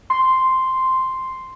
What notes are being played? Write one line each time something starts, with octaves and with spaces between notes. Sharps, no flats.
C6